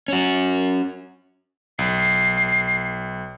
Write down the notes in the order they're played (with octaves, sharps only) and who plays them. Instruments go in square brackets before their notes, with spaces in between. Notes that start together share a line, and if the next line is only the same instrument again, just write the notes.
[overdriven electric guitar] C#4 F#4
[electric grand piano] B1 [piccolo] C7